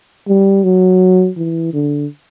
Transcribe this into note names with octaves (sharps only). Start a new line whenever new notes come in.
G3
F#3
E3
D3